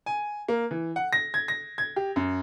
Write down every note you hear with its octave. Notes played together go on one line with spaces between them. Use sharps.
G#5
A#3
E3
F#5
A#6
G#6
A#6
G#6
G4
F#2